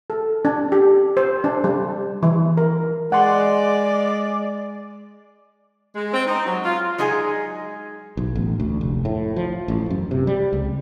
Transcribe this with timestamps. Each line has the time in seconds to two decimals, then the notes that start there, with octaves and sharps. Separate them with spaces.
0.10 A4
0.45 D4
0.72 G4
1.17 C5
1.44 D4
1.64 G3
2.23 E3
2.57 A#4
3.12 G#3 D5 F#5 C6
5.96 G#3
6.13 C4
6.27 D#4
6.46 F#3
6.65 F4
6.98 F#3 G#3 D#4 G#4 B4 G#5
8.17 B1
8.35 A1
8.60 D2
8.81 F1
9.05 A2
9.36 F3
9.68 A1
9.90 F#2
10.11 C3
10.27 G3
10.53 C#2